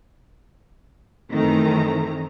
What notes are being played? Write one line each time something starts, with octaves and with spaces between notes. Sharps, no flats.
F#2 D#3 E3 A3 C4 A#5